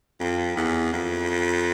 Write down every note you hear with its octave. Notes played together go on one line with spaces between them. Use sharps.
F2
E2
F2